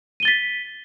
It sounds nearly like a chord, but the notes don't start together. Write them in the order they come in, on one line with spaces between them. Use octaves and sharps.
D#7 G7 A6 B6